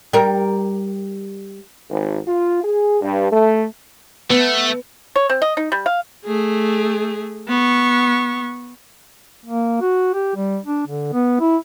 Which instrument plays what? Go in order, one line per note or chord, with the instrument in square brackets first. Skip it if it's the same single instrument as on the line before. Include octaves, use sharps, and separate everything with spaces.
[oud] G3 A#4
[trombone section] G#1
F4
G#4
G2
A3
[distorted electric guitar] A3 [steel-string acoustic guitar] B3
[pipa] C#5
C4
D#5
D#4
G3
F5
[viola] A3 G#4
B3 C#6
[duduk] A#3
F#4
G4
G3
D4
D3
B3
E4